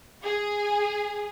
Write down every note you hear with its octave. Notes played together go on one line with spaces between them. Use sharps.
G#4